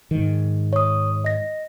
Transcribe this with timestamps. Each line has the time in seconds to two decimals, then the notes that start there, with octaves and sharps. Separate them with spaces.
0.11 G#2 D#3
0.73 C#5 D#6
1.24 D#5 A#6